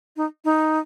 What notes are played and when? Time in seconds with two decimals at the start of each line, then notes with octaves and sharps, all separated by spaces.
0.17 D#4
0.45 D#4